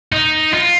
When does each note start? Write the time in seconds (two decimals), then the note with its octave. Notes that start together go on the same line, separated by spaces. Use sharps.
0.13 D#4
0.54 F4